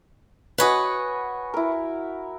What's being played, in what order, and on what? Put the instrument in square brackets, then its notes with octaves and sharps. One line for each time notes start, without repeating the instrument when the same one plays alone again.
[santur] F#4 G#5 B5 [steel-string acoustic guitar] B4 C#5 D#5
[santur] E4 A#4